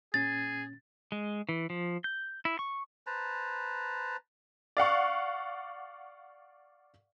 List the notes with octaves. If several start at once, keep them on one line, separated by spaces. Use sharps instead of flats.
A#2 C#4 G#4 A6
G#3
E3
F3
G6
E4
C#6
B4 C5 A5 A#5
D5 F5 F#5 C#6